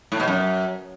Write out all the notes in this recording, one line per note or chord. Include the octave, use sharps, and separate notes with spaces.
A2
B2
F#2